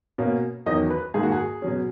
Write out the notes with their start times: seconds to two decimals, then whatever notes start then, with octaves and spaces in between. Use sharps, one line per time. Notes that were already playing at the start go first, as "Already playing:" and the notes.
0.18 B2 A#3 C#4
0.66 E2 D#3 F#3 C#4 D#5
0.90 B4
1.14 G#2 D#3 A#3 G#4
1.23 F#4
1.32 G#4
1.62 B2 F#3 C#4